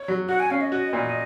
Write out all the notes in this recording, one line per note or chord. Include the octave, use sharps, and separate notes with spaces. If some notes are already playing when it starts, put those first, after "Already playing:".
Already playing: C#5
F#3
F#4 F#5
G#5
C#4 F5
D#5
F#4
A#2